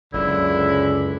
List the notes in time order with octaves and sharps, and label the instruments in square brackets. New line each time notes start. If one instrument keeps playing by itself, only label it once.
[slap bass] F#1 [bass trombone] C#2 [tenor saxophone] D3 [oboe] E4